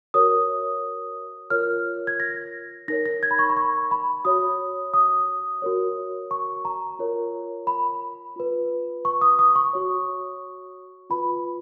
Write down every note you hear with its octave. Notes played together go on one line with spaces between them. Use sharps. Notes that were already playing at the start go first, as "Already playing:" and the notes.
F#4 A#4 C#5 D#6
F4 A#4 C#5 F6
G#6
A#6
D#4 A#4 C#5 A#6
A#6
G#6
B5
C#6
B5
C#6
B5
F#4 C#5 D#6
D#6
F#4 A#4 C#5
C#6
A#5
F4 A#4 C#5
B5
F4 B4
C#6
D#6
D#6
C#6
F#4 C#5
F4 B4 B5